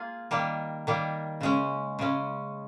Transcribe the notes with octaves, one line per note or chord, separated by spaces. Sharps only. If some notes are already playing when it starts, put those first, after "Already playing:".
Already playing: A#3 F4 G#4
D#3 G3 A#3
D#3 G3 A#3
C#3 G#3 C#4
C#3 G#3 C#4